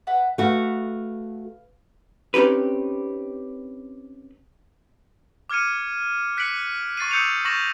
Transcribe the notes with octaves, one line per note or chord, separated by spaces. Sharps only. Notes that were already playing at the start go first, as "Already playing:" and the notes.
B4 E5 F#5
A3 F#4 B4 F5
C4 C#4 D#4 G4 B4
D6 F6 G#6 C#7 D#7
F#6 B6 C#7 D7 F#7
C#6 A6 C7 D#7
D#6 E6 G6 C#7 D#7 F7
C#6 A6 A#6 E7 F#7